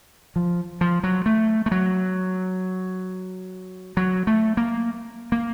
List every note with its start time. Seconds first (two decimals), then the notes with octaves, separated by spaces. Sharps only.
0.36 F3
0.81 F3
1.04 F#3
1.26 A3
1.66 A3
1.71 F#3
3.97 F#3
4.27 A3
4.57 A#3
5.32 A#3